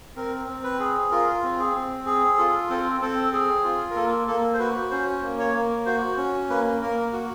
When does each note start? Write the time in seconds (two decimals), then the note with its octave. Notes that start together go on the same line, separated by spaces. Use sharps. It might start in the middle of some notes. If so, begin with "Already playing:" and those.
0.16 C4 A#4
0.48 C4
0.64 B4
0.80 G#4
1.11 F4 A#4
1.43 C4
1.59 G#4
1.75 C4
2.06 G#4
2.38 F4 A4
2.70 C4 A4
3.01 C4 A4
3.32 G#4
3.64 F4
3.90 A#4
3.96 A#3 A4
4.27 A#3 A4
4.54 C5
4.59 F#4 B4
4.91 C#4 C5
5.23 A#3
5.39 C#5
5.54 A#3
5.86 F#4 C5
6.17 C#4
6.49 A#3 B4
6.81 A#3 A#4
7.13 F#4